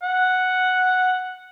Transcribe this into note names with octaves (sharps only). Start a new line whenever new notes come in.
F#5